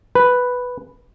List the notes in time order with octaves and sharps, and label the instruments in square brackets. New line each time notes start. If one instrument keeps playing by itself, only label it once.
[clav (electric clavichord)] B4